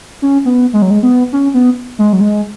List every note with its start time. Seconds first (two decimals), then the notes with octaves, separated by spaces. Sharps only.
0.22 C#4
0.45 B3
0.73 G#3
0.82 F#3
0.90 G#3
1.03 B3
1.33 C#4
1.54 B3
1.99 G#3
2.13 F#3
2.21 G#3